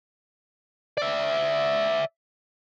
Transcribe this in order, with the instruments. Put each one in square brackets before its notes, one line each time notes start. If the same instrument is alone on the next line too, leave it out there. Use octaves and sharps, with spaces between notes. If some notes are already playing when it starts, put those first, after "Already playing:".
[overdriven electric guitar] D5 E5